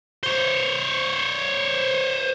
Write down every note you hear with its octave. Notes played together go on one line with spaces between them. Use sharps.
C5 C#5